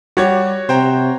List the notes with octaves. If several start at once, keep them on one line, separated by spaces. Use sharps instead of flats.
G3 F#4 G4 C#5 G#6
C3 C5 G5 A#5